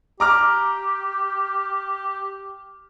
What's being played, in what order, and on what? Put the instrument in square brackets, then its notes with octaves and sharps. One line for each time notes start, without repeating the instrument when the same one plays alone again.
[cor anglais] G4 [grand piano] A#5 D6 F6